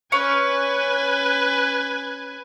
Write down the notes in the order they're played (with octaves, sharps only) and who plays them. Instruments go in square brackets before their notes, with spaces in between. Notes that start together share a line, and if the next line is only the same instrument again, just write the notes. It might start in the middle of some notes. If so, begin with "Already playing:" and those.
[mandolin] C#4 [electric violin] B4 G#5